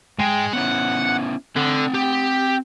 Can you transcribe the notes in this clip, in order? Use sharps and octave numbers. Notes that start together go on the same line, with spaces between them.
G#2 G#3 G5
B3 C#4 E4 F#5
D3 C4 F#5
G4